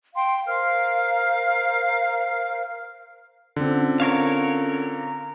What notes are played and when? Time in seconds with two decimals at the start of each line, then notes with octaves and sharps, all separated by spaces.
0.14 F5 G5 C6
0.47 A#4 C5 F5 F6
3.56 D3 C4 C#4 F4 A4
4.00 A#4 C#5 F5